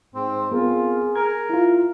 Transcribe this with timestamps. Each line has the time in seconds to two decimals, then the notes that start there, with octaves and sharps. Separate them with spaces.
0.15 G#2 C4
0.52 B3 C4 F4 G#4 A#4
1.16 A#4 G#6
1.50 E4 F4